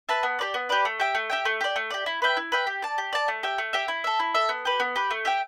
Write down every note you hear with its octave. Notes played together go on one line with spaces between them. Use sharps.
B4 E5 A5
B3
G4 B4 D5
B3
G4 B4 D5
A3
G4 E5 G5
A3
G4 E5 G5
A3
G4 D5
A3
G4 D5
E4
B4 E5 G5
E4
B4 E5 G5
G4
D5 A5
G4
D5 A5
A3
G4 E5 G5
A3
G4 E5 G5
E4
A4 E5
E4
A4 E5
B3
G4 B4
B3
G4 B4
A3
G4 E5 G5